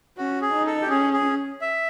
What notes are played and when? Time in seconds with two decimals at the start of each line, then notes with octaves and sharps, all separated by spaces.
0.18 C#4 F#4
0.41 G#4
0.54 D#4
0.66 A4
0.82 G4
0.90 C#4 G#4
1.13 G#4
1.61 E5